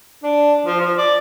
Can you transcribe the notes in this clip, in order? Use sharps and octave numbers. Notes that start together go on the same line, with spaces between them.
D4
F3
F3
D5